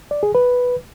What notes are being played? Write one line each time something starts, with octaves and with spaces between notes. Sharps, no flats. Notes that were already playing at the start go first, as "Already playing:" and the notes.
D5
G#4
B4